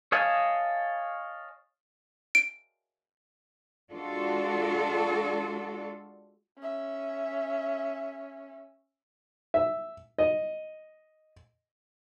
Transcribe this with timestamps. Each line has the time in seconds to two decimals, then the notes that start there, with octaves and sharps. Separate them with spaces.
0.12 C#5 D#5 F5 G#5 A5
2.35 D7
3.91 G#3 D4 F4 F#4 A4
6.59 C#4 E5
9.54 E5
10.18 D#5